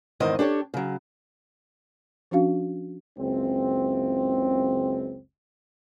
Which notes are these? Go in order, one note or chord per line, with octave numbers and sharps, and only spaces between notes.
E2 G#2 D#3 C4 D#5
D4 G4 A4 C#5
C#3 F#3
F3 C#4 D4 F#4 F5
F#1 C#2 C4